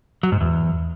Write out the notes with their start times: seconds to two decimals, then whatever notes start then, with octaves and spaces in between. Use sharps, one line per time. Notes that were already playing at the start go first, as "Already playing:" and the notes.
0.23 F#3
0.32 G#2
0.41 E2